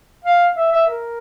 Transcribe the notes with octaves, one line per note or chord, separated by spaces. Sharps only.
F5
E5
E5
A#4